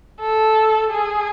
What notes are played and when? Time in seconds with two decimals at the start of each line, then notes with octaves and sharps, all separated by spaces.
0.21 A4
0.91 G#4